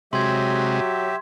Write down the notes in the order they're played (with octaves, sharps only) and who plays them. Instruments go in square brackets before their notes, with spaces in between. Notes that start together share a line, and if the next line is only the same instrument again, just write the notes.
[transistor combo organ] C3 G#3 [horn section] F#3 [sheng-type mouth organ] G4 E5 [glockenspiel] C6 G#6